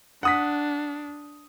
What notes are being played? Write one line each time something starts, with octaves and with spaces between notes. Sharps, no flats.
D4 F#5 D#6 B6